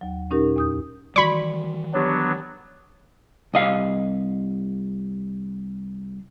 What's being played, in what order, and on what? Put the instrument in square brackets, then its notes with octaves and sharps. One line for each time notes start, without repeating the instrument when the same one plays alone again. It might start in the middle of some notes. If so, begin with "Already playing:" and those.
[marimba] D#2 F#3
A#2 C#4 D#4 G4 A#4
E2 D#6 G6
[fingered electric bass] D#3 E3 G3 [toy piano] F#4 D5 [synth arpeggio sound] B5 C#6
[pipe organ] F#3 B3 D4 [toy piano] G4 C#5
[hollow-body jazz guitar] C2 D#5 F5